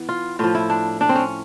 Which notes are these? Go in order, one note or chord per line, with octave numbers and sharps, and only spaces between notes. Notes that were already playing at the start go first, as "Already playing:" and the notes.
Already playing: E3 B3
F4
A2 F3 F4
E4
D4
D4
C4
C#4